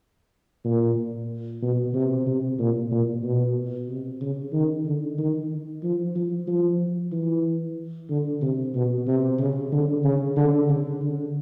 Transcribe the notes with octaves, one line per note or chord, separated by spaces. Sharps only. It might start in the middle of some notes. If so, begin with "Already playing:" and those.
A#2
B2
C3
C3
A#2
A#2
B2
C3
C#3
D#3
D3
D#3
F3
F3
F3
E3
D3
C3
B2
C3
C#3
D3
C#3
D3
C#3
D3